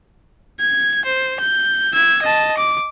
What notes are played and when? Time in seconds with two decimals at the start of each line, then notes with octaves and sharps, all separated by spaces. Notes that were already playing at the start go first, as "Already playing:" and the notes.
0.60 G#6
1.05 C5
1.40 G6
1.94 E6 G#6
2.22 D#5 A5
2.57 D6